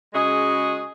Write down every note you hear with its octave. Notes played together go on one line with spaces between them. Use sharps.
C#3 G#3 F#4 G#4 D#5